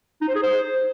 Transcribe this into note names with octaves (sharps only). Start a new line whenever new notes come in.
D#4
C5
G#4
C5